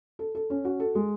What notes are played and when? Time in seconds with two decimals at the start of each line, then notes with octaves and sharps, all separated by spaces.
0.19 A4
0.35 A4
0.50 C#4
0.65 F#4
0.80 A4
0.95 G#3